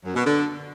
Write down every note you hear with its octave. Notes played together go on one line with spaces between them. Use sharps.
F#2
B2
D3